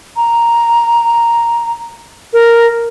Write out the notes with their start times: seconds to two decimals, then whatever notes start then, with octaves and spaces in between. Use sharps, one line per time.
0.17 A#5
2.33 A#4